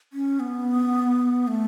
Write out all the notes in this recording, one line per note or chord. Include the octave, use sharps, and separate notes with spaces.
C#4
B3
A3